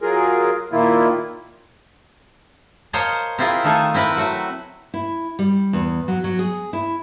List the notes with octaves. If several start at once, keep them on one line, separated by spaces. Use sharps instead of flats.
F#3 F4 G#4 A#4
A#2 D#3 A#3 E4 F4
A#4 C5 C#5 D#5 F5 A5
C4 E4 F4 G#4 A#4
D#3 A3 D#4 A4 F5 G#5
C4 E4 A#4 B4
F#3 A3 F#4
E4
G3
E2
F#3
F#3
G#4
E4